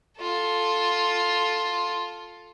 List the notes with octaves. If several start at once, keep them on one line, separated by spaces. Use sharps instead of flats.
F4 A4